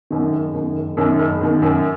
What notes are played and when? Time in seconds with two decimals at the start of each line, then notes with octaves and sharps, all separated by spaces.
0.11 F#2 D#3
0.32 F#1
0.53 F#2 D#3
0.75 F#1
0.97 F#2 D#3
1.19 F#1
1.41 F#2 D#3
1.62 F#2